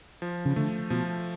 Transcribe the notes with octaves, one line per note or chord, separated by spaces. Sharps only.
F3
C#3
D3 A3
B2 F3